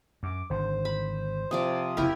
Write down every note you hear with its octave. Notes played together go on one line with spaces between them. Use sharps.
F#2 D6
G#1 D3 C5
B5
C3 F3 D5 D#6
F#1 F#2 C3 E4 G4 A#4